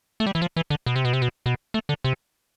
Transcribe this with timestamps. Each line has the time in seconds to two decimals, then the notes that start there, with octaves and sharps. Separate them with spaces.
0.20 A3
0.26 G3
0.35 E3
0.42 F3
0.56 E3
0.70 D3
0.86 B2
0.96 C3
1.05 B2
1.13 C3
1.22 B2
1.46 B2
1.74 A3
1.89 D3
2.04 C3